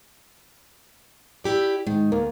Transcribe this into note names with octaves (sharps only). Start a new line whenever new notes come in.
E4 G4 D5
G#2 D#3
D2 A#3